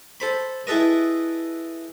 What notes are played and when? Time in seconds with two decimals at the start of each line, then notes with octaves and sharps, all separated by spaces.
0.20 A4 C5 B5
0.67 E4 G#4 A4 B4 D#5